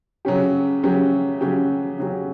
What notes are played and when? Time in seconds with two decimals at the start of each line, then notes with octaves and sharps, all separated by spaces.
0.25 C#3 F#3 C#4 G4
0.83 C#3 F#3 C#4 G4
1.41 C#3 F#3 C#4 G4
1.98 C#3 F#3 C#4 G4